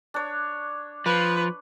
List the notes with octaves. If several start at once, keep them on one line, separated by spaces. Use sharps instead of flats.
D4 C#5
F3 B4